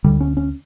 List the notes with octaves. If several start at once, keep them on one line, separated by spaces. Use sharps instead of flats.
D2 D3 G3
C#4
C#4